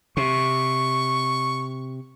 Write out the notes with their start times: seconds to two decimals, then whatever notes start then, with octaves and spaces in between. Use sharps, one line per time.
0.17 C3 C#6